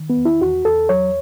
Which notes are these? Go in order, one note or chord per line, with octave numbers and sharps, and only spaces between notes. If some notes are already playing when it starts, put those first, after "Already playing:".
Already playing: D#3
B3
E2
E4
E2 F#4
E2 A4
F#3 C#5